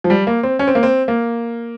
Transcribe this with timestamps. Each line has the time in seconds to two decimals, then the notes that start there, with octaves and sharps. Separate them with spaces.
0.04 F3
0.10 G3
0.27 A#3
0.43 C4
0.59 C#4
0.67 C4
0.75 A#3
0.83 C4
1.08 A#3